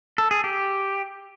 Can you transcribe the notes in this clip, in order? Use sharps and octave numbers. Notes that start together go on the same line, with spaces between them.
A4
G#4
G4